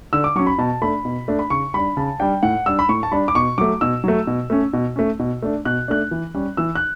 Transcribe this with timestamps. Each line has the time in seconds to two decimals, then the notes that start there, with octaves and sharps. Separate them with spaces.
0.13 D3 E6
0.24 D6
0.36 F#3 C#4 C#6
0.47 B5
0.58 B2 A5
0.82 A3 D4 B5
1.05 B2
1.28 A3 D4
1.39 B5
1.50 C#3 C#6
1.74 G3 D4 B5
1.97 C#3 A5
2.20 G3 D4 G5
2.43 A2 F#5
2.66 G3 D4 E6
2.79 B5
2.89 A2 C#6
3.03 A5
3.12 G3 D4 B5
3.28 D6
3.35 B2 C#6
3.58 F#3 A3 D6
3.81 B2 E6
4.04 F#3 A3
4.27 B2
4.50 A3 C#4
4.73 B2
4.96 A3 C#4
5.19 B2
5.43 A3 D4
5.65 B2 F#6
5.88 A3 D4 F#6
6.11 E3
6.34 G3 C#4
6.57 E3 E6
6.75 F#6